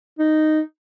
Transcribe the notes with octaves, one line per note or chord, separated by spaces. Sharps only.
D#4